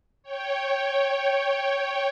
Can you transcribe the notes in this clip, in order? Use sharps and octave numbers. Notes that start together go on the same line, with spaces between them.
C#5 G5